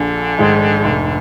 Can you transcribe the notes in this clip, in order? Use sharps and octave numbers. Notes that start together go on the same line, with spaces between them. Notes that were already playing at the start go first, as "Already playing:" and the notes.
Already playing: A#1 D3
G#2 D#3 G#3
F1